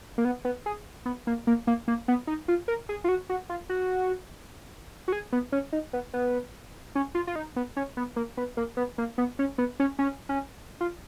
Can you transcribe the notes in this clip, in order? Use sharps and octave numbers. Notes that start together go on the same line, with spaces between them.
A#3
B3
B3
G#4
B3
A#3
A#3
A#3
A#3
B3
D#4
F4
A#4
G#4
F4
F#4
F#4
F4
F#4
F#4
G#4
B3
C#4
D#4
B3
B3
C#4
F4
F4
D#4
B3
C#4
B3
A#3
B3
A#3
B3
A#3
B3
C#4
B3
C#4
C#4
C#4
F4